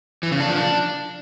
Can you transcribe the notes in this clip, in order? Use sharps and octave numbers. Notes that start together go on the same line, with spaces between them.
E3
C#3
D4
F3
D4